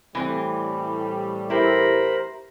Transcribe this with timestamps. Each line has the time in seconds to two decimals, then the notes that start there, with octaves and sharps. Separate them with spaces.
0.15 A2 E3 G3 C4
1.50 E4 G4 A#4 C5 B5